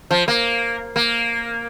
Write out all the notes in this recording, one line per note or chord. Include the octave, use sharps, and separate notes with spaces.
F3
A#3
A#3